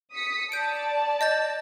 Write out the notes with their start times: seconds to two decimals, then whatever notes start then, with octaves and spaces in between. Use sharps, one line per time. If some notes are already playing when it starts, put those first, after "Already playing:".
0.14 D#6 B6 C#7
0.52 D5 A5 G6 D7
1.21 D#5 G6 A6